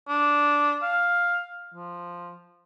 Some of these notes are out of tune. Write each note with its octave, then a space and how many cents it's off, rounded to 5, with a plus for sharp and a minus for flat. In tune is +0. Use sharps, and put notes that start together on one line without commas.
D4 -10
F5 +5
F3 +0